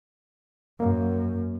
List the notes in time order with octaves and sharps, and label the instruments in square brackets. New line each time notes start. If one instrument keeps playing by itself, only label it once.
[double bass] F#2 [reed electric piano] A#3